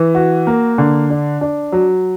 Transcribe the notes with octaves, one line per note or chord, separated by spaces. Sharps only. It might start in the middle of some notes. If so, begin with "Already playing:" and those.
Already playing: E3
F#4
A#3
D3
D4
D4
F#3